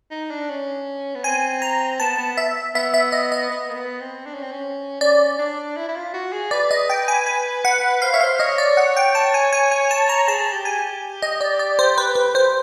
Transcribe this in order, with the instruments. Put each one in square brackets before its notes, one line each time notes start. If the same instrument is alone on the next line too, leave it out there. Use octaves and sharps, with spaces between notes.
[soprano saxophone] D#4
D4
C#4
B3
[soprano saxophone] C4 [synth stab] G#5
[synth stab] A#5
[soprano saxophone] B3 [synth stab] A5
[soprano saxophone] B3
[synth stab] E5
[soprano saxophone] B3 [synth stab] E5
[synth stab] E5
D#5
D#5
[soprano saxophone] B3
A#3
B3
C4
D4
C#4
C4
C#4
[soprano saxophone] C#4 [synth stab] D5
[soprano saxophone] D4
E4
E4
F4
F#4
G#4
[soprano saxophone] B4 [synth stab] D5
[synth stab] D#5
G5
G#5
G#5
F#5
[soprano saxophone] C5 [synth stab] F5
[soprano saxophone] C#5 [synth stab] E5
[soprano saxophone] C5 [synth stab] F5
[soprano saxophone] C#5 [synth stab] D#5
[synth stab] D5
F#5
G5
A5
G#5
G#5
G#5
A5
A#5
[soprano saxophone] G#4 [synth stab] A5
[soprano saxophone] G4
[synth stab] G#5
[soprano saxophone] G4
[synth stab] D#5
D5
D5
C5
B4
B4
C5